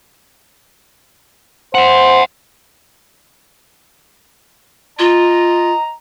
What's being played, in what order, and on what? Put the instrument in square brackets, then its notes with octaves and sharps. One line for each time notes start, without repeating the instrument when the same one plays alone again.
[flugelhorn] C5 [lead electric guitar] E5 F#5
[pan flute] F4 [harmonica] D#5 A#5